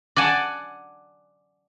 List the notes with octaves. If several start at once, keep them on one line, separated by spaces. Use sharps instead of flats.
D5 F#5 G#5 A5